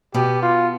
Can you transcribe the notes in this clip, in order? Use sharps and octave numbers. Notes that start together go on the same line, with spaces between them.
B2 B3 G4
F4